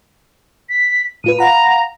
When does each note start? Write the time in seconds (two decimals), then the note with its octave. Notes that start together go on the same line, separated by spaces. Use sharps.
0.69 B6
1.24 A2 F4 B4 D#7
1.39 F5 F#5 A#5 B5